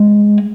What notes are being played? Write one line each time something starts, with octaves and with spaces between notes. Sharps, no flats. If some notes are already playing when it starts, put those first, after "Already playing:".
Already playing: G#3